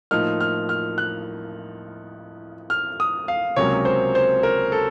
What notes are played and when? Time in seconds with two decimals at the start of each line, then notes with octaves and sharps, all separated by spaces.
0.11 A2 F3 A#3 D#4 F6
0.41 F6
0.69 F6
0.98 F#6
2.70 F6
3.00 D#6
3.28 F5
3.56 C#2 C3 F#3 A#3 C#4 C#5
3.85 C5
4.15 C5
4.43 A#4
4.72 A4